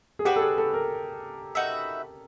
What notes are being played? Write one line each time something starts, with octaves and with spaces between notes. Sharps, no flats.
G#4
D4 F#4 G4 B4
A4
G#4
A4
A#4
D#4 F#4 B4 E5